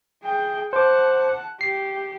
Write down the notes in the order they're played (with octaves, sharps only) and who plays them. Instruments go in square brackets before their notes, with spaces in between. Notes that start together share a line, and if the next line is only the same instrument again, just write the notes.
[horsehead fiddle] G#4 G5
[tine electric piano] C5 D6 [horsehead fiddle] F#5 A5
[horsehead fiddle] G4 [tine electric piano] C7